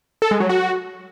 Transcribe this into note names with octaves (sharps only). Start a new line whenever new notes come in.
A4
G#3
F#3
F#4